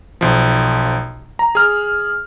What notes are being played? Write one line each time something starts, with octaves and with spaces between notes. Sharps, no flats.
B1 F3
A#5
G#4 F6